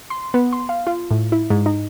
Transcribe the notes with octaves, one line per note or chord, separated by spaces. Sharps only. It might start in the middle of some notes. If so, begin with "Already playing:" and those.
C6
B3
C6
F5
F4
A2
E4
G#2
D#4